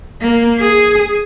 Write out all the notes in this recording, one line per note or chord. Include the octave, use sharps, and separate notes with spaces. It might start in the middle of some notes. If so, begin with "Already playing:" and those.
A#3
G#4